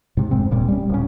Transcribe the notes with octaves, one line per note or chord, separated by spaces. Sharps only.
G#2 C3
F1 G#3 C4
D#1 A#2 G3
G3 C#4
D1 C#4